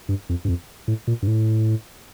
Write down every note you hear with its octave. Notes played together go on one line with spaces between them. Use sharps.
G2
F2
G2
F2
A2
A#2
G2
A2